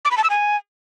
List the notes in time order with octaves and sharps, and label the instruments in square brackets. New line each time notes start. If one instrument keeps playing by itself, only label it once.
[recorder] D6
B5
A5
E6
G#5